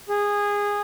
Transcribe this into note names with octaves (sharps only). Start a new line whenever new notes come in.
G#4